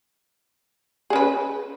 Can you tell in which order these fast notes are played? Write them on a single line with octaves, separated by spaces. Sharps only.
G#4 C#4 B4